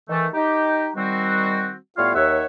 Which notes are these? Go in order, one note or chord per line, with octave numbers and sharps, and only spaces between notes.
D#3 E3 A3
D#4 G4
D#3 G3 C4 F#4
A2 G3 B3 F4 C#5 F5
D#2 C#5 E5 F#5